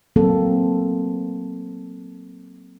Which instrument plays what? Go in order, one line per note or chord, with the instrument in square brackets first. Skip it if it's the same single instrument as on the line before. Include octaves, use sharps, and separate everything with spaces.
[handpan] F#3 A#3 C4 A4